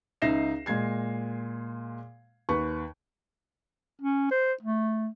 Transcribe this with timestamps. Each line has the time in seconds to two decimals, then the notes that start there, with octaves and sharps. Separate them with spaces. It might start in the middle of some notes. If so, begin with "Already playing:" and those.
0.22 C#2 D#4 E5 A#6 C7 E7
0.66 A#2 G#3 G#6 C7
2.49 D#2 B4 C#6
4.01 C#4
4.31 C5
4.62 A3